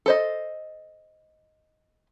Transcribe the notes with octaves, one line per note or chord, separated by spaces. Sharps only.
A4 C5 D#5